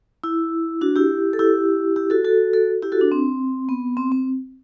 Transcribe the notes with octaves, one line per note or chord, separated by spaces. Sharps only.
E4
D4 F#4
E4 G4
A4
E4 G4
E4 G4
F#4 A4
F#4 A4
F#4 A4
E4 G4
F#4 A4
D4
C4
B3
C4
C4